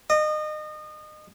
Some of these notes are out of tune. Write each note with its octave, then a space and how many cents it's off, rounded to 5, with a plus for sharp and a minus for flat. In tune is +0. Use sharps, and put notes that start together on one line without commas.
D#5 -30